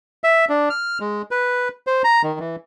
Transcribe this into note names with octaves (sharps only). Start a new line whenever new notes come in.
E5
D4
F6
G#3
B4
C5
A#5
D#3
E3